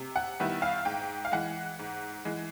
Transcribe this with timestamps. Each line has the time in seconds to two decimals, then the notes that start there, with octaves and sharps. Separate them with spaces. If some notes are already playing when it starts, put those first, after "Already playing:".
Already playing: C3
0.16 F#5
0.40 D#3 G3 B3 E4
0.62 F5
0.85 G#2 G5
1.25 F5
1.32 E3 G#3 F#5
1.79 G#2
2.25 E3 G#3